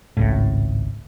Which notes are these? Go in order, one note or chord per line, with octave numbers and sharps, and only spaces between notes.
G#1 C#2 A2